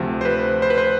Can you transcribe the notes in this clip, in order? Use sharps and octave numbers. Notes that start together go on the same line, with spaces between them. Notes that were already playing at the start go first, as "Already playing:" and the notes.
Already playing: D2 C3 F3
C5
B4
C5
B4
C5